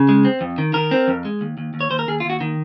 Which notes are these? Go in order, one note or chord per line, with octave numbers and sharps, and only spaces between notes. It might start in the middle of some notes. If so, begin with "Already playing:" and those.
Already playing: C#3
G#3
C4
F2
D#3
D#3 A#4
C4
F2
G#3
D#2
D#2
D#2
C#5
D#2 C5
A#4
D#2 G#4
F4
D#2 F#4
D#3